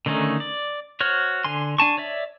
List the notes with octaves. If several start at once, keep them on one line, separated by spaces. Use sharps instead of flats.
D3 D#3 A3 C#4 D#4
D5
F#4 C5 C#5 F6
D3 G#5 C6
D4 G#5 A5 C#6
C#5 D5 E5